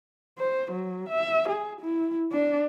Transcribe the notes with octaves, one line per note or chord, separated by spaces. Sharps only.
C5
F#3
E5
G#4
E4
D4